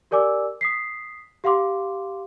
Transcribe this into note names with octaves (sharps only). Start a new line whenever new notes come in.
G4 A#4 D5 G#5 D6 E6
D#6 B6 C7
G4 F5 F#5 C6 D6